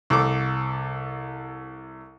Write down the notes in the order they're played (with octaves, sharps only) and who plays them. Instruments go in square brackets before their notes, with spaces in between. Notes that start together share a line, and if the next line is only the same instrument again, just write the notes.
[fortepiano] C2 A4 D6